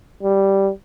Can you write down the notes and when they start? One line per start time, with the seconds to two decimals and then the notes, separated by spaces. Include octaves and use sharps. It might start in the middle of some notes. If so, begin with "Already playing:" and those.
0.23 G3